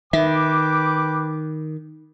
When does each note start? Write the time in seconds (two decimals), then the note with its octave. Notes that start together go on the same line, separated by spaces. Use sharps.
0.13 D#3 B4 E5 G5 D6